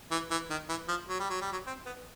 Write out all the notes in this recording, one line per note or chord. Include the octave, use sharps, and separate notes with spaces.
E3
E3
D#3
E3
F3
F#3
G3
F#3
G3
F#3
C4
B3